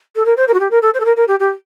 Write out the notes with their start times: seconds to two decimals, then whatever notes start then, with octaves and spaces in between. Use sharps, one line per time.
0.16 A4
0.25 A#4
0.37 C5
0.48 A#4
0.54 F#4
0.60 G4
0.71 A#4
0.82 A4
0.94 C5
1.00 A4
1.05 A#4
1.16 A#4
1.28 G4
1.40 G4